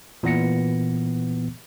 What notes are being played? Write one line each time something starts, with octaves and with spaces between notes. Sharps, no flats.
A#2 E3 B3 A#6 C#7